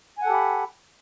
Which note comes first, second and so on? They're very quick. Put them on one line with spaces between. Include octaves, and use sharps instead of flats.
G#5 F#5 A4 G4 B5